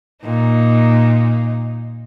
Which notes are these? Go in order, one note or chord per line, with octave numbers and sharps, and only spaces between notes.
A#2 D#4